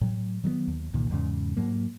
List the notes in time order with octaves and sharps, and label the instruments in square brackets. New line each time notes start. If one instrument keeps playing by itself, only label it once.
[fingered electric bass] A2 F#3
D#3 F#3 G#3 B3
D#2
C2 A#2 D#3
E2 G#2 C#3
G#2 F#3 A#3